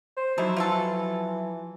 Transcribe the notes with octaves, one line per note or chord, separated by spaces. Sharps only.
C5
D3 F3 F#3 D#4 E4
E3 F4 F#4 A4